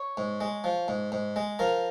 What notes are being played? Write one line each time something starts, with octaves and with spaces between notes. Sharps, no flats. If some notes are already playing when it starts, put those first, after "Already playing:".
Already playing: C#5
G#2
G#3
F3
G#2
G#2
G#3
F3 A#4